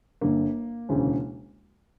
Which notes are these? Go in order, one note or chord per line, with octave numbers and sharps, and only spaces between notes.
G1 G2 D3 A#3
E1 D2 C#3